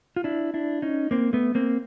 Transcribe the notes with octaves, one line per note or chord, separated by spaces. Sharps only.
F4
D4 E4
D4 E4
C#4 D#4
A#3 C4
A3 B3
A#3 C4